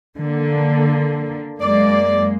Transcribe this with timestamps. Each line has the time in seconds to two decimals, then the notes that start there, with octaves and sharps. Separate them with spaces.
0.16 D3 A#3
1.61 F#2 G#3 A#3 D5